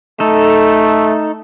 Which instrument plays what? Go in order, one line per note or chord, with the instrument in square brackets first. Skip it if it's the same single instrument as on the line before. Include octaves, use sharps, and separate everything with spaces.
[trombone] A3 [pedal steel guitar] D#4 A4